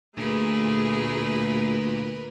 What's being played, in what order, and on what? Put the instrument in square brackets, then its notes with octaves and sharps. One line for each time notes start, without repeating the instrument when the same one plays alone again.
[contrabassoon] D2 [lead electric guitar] A#2 [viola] A3 G#4 [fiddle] A#4 B4